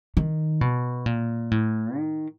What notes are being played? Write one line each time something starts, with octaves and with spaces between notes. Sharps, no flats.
D#3
B2
A#2
A2
D#3